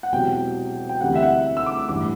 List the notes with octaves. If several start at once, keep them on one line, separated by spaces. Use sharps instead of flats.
F#5
E1 E2 C3 F#3 G5
G5
D2 C3 E3 G3 F#5
E5
F#5
E6
D6
A1 G2 E3 D6